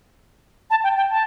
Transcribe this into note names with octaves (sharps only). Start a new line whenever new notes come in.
A5
G5
G5
A5